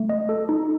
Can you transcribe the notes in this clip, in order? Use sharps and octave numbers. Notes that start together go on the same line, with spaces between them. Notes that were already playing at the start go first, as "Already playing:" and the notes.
Already playing: A3
D#5
A4
D#4